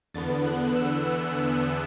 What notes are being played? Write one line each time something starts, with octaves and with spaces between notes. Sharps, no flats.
E2 D3 B3 A6
F#6
E6
F#6